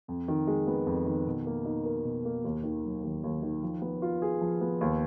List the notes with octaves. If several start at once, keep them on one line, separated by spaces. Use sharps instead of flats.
F2
D#3
G#3
B3
F2
D#3
B2
A#3
D#4
A#4
B2
A#3
D#2
D#3
F#3
D#2
D#2
D#3
F3
B3
F4
G#4
F3
B3
D#2